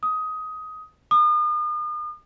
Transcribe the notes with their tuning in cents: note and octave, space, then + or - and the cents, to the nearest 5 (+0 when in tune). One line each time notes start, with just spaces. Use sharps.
D#6 +15
D#6 -40